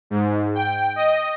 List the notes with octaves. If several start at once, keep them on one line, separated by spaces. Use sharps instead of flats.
G#2
G5
D#5